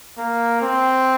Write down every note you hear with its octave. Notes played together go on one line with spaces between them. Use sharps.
A#3
C4